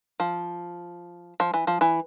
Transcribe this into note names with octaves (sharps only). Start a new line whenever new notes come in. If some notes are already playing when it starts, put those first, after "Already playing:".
F3
F3
E3
F3
E3